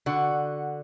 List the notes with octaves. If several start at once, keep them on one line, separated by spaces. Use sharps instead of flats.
D3 F#4